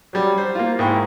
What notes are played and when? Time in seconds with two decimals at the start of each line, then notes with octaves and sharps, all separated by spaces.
0.13 F#3 G3
0.38 C5
0.55 A#3 F4
0.79 G#2 A#3 E4 G5 C#6